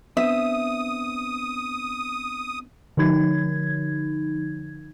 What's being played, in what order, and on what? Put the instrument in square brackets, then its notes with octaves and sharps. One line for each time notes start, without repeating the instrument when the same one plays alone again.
[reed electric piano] B3 C4 D4 [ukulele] E5 [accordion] D#6
[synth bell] D3 F3 D#4 G#6